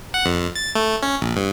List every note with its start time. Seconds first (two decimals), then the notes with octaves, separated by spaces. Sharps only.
0.14 F#5
0.26 F2
0.55 A6
0.75 A3
1.03 C#4
1.22 A#1
1.36 G2